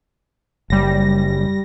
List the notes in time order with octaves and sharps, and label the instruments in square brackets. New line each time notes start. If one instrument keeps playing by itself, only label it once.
[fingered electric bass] F#1 [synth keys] G3 A#6